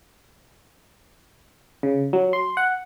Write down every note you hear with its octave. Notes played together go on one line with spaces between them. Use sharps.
C#3
F#3
C6
F#5